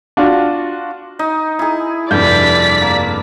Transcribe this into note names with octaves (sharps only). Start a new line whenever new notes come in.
D4 F4 F#4
D#4
E4 G#4
F1 G2 D5 G6 B6
A#3